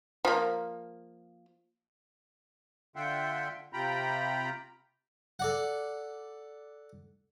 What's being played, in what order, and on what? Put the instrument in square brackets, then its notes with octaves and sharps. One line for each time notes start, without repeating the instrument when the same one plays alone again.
[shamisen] F3 A#3
[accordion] D3 F4 E5 F#5 G5 C6
C3 F4 G5 A#5 B5
[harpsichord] A4 D5 F#5